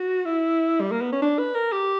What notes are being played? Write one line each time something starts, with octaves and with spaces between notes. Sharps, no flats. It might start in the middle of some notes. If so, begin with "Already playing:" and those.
Already playing: F#4
E4
G3
A#3
B3
C#4
D4
B4
A#4
G4